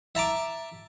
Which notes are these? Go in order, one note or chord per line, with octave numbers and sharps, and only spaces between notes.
E5 A5 A#5 D6